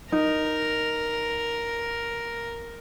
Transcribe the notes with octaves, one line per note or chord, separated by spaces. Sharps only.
D#4 A#4